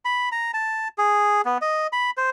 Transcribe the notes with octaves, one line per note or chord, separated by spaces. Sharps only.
B5
A#5
A5
G#4
B3
D#5
B5
C5